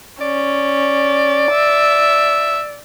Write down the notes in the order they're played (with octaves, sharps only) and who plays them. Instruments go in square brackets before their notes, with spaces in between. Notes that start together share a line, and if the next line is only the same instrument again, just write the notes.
[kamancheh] C#4 [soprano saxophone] D5
[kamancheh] E5